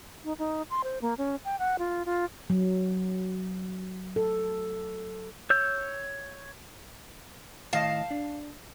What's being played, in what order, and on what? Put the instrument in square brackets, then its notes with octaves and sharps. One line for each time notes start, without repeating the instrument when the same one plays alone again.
[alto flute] D#4
D#4
C6
C5
A#3
C#4
G5
F#5
F4
F4
[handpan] F#3
A4
[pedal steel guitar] C#5 E6 G6
[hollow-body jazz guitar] A2 D#3 D#5 [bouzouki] F5 A5
[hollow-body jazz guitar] D4